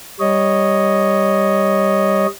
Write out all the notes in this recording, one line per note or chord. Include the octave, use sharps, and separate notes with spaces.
G3 C#5 D#5